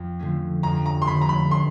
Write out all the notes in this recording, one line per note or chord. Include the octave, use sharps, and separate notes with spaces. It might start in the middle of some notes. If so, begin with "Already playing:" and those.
Already playing: F2
D3 F3 A3 C#4
F2 A#5
A#5
C6
D3 F3 A3 C#4 B5
A#5
B5
C6